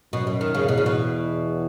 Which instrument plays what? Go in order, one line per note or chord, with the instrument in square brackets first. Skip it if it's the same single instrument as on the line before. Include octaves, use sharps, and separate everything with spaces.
[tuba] F#2 [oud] B2
[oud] B2
D#3
C#3
[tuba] E2 [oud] B2
[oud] C#3
B2